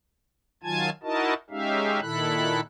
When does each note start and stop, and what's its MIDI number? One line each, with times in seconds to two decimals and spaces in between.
0.63 0.90 51
0.63 0.90 54
0.63 0.90 65
0.63 0.90 80
0.63 0.90 81
0.63 0.90 92
1.03 1.34 63
1.03 1.34 64
1.03 1.34 66
1.03 1.34 70
1.03 1.34 75
1.03 1.34 81
1.50 2.00 56
1.50 2.00 61
1.50 2.00 63
1.50 2.00 67
1.50 2.00 76
1.50 2.00 77
2.01 2.61 46
2.01 2.61 51
2.01 2.61 64
2.01 2.61 69
2.01 2.61 83
2.01 2.61 90